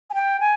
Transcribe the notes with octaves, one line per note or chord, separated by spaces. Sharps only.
G#5
G5
G#5